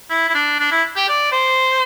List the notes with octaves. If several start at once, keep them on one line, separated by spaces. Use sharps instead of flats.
E4
E4
D4
D4
E4
G4
D5
C5